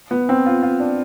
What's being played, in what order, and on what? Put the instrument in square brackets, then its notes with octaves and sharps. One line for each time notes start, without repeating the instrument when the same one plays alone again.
[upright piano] B3
C4
F4
F4
D4